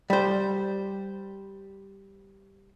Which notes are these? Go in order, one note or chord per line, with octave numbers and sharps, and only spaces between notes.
G3 C5